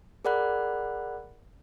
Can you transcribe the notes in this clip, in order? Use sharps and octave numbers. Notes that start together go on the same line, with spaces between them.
G#4 A#4 D5 F#5 B5 F#6